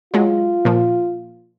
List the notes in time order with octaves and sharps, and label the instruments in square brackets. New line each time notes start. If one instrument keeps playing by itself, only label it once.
[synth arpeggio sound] F#3 G#3 [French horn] F4
[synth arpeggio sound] A#2 F3